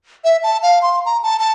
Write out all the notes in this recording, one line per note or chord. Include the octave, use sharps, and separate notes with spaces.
E5
A5
F5
C6
A#5
A5
A5